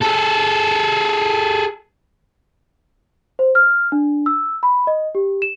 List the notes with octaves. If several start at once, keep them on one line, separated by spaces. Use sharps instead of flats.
G#4 A4
C5
F6
D4
E6
B5
D#5
G4
E7